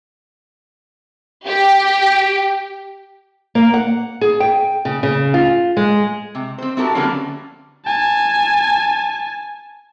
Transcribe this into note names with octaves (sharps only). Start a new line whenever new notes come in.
G4
A#3
F#5
G#4
G5
C#3
C#3
F4
G#3
C3
C4 C5
C4 E4 F#4 G4 A4 A#4
D3 F#3 G3 A#3 B3 C#4
G#5 A5